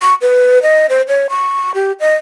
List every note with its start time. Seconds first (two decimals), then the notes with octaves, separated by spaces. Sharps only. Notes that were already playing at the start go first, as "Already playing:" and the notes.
0.02 C#6
0.21 B4
0.63 D#5
0.90 C5
1.08 C#5
1.30 C#6
1.75 G4
2.00 D#5